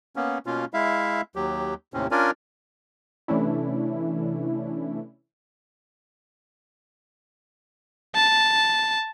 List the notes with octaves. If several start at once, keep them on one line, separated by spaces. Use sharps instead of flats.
A#3 B3 C#4
B2 A#3 C#4 F4
G#3 E4 E5 F5
D#2 F#3 G4
D#2 A2 C3 C4 C#4
C#4 D4 F4 A#4 D5 G#5
C3 E3 A3 C#4 D4 E4
A5